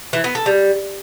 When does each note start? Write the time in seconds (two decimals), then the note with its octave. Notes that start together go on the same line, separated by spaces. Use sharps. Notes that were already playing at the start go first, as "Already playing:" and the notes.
0.13 E3
0.24 B3
0.35 A4
0.46 G3